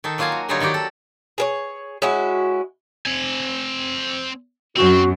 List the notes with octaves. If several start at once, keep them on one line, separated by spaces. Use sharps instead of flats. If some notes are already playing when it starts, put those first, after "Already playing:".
D#3 D#4 A4
F#3 A#3 F4 F5 G#5 A#5
F#4
D3 F#3 G3 D#4 F4 C#5
D#3 F#3 F#4 G4 D5
A4
G#4 A#4 C#5
G#3 C#4 E4 F#4
C4 G#5
F#2 C4 F#4